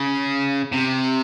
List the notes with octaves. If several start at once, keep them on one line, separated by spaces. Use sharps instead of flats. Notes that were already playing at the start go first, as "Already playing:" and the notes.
Already playing: C#3
C3